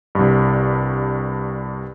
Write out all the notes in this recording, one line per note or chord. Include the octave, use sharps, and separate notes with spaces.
C2 G2